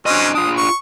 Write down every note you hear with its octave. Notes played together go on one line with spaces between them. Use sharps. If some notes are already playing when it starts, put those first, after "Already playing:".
F#3 C#4 D4 C5 D#5
D4 F4 D#6
C#6